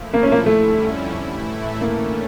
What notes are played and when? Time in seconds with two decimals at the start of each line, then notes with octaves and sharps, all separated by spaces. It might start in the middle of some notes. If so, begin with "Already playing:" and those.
Already playing: A#2 F3 A3 E4
0.14 A#3
0.23 C#4
0.32 A#3
0.46 F2 D3 G3 A3 C#4 E4
1.14 A2 E3 A3 E4
1.81 D3 A3 A#3 C#4